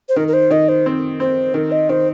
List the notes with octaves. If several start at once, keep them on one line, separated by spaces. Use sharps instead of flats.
C5
D#3 A#4
A#4
C5
D#3 D#5
C5
C4
C4 C5
D#3 A#4
D#5
D#3 C5